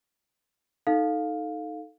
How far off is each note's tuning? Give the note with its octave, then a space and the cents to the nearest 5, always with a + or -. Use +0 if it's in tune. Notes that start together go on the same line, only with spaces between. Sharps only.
D#4 +0 A4 +0 F5 +15